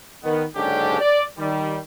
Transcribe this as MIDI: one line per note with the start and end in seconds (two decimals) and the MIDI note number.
0.24 0.44 51
0.24 0.44 59
0.56 0.99 30
0.56 0.99 44
0.56 0.99 50
0.56 0.99 61
0.56 0.99 62
0.56 0.99 67
1.01 1.23 74
1.38 1.78 51
1.38 1.78 55